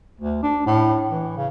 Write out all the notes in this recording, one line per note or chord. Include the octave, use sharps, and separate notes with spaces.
D2
D4
A2
E3
C#3